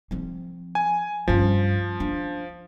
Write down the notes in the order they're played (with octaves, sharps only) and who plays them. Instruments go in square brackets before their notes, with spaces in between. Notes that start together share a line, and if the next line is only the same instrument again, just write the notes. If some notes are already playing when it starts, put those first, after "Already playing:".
[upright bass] F3 C4
[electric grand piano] G#5
[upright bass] G2 C#4 [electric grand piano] F3
[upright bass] D4